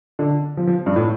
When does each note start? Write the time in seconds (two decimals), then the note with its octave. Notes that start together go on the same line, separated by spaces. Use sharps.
0.19 D3
0.57 F3
0.67 F3
0.86 G2
0.96 A2